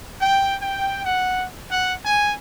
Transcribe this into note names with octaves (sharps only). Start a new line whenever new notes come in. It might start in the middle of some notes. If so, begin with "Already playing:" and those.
G5
G5
F#5
F#5
G#5